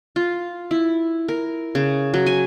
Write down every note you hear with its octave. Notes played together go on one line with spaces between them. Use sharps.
F4
E4
A#4
C#3
F#3
G#5